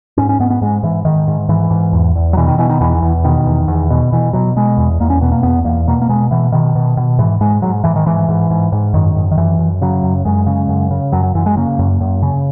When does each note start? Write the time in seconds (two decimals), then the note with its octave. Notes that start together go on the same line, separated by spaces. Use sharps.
0.17 G#2 C#4
0.29 C#4
0.39 G#2 B3
0.50 B3
0.62 G#2 G#3
0.83 G#2 E3
1.05 G#2 D#3
1.27 G#2
1.49 G#2 E3
1.71 G#2
1.93 E2
2.16 E2
2.33 F#3
2.37 B2 E3
2.47 D#3
2.58 B2 E3
2.69 D#3
2.81 E2 E3
3.02 E2
3.24 B2 D#3
3.46 E2
3.68 E2
3.91 B2
4.12 B2 E3
4.33 B2 F#3
4.56 B2 G#3
4.78 E2
5.00 E2 A#3
5.10 C#4
5.22 B2 B3
5.32 A#3
5.43 E2 B3
5.65 E2 A#3
5.87 B2 A#3
6.02 A#3
6.09 B2 G#3
6.31 B2 E3
6.52 B2 D#3
6.75 B2
6.97 B2
7.19 G#2 E3
7.41 G#2 G#3
7.62 G#2 F#3
7.84 G#2 E3
7.96 D#3
8.06 G#2 E3
8.29 G#2
8.50 G#2
8.72 G#2
8.94 F#2 D#3
9.16 F#2
9.31 D#3
9.37 F#2 E3
9.59 F#2
9.81 C#3 F#3
10.03 F#2
10.25 F#2 G#3
10.47 C#3
10.69 F#2
10.91 C#3
11.12 F#2 F#3
11.23 F#3
11.35 F#2 E3
11.46 G#3
11.57 C#3 A#3
11.79 F#2
12.01 F#2
12.22 C#3